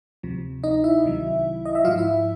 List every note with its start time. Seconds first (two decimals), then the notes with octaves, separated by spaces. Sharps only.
0.23 D2 C3 F3
0.64 D#4 D#5
0.84 E4 E5
1.04 C2 C3 D#3 F#3
1.65 D#5
1.75 E5
1.84 F3 F4 F5
1.87 G#2
1.98 E4 E5